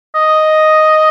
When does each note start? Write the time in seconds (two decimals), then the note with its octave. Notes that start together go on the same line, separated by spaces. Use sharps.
0.15 D#5